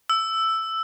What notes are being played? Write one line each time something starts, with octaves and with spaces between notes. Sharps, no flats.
E6